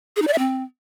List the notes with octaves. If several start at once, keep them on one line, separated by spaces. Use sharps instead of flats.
G#4
D#4
D5
E5
C4